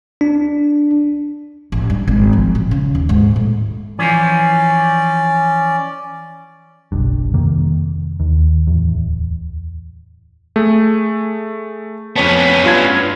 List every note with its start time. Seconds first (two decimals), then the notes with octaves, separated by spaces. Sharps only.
0.21 D4
1.72 A1
1.90 G2
2.07 G#1
2.33 F3
2.55 A1
2.71 C#3
2.95 D#2
3.09 G#2
3.36 A2
3.99 E3 F3 C#4 D5
6.92 F#1 B1 G2
7.34 F2 C3 D#3 A#3
8.20 D#2
8.67 D1 E2
10.56 A3 G#4
12.16 F2 B3 C#4 C#5 A5
12.64 G2 F4 G#6